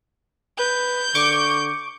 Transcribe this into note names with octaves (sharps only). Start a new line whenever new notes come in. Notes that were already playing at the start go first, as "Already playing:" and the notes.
B4 G6
D3 C#6 D6